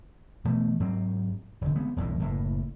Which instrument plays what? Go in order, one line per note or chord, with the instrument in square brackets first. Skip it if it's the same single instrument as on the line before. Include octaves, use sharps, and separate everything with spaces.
[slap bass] B2 E3 A3 B3
G#2 F#3 C4
E1 D2 D3
G#3 B3 C4
E1 C2 A2
F#1 A2